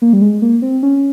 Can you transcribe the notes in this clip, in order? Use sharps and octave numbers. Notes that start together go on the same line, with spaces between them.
A#3
G3
G#3
A#3
C4
C#4